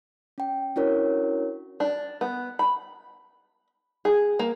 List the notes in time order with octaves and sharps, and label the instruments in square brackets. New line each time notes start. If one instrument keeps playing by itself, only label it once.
[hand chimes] C#4 G5
C#4 D4 E4 F#4 A#4 C#5
[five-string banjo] D4
B3
B5
G#4
A#3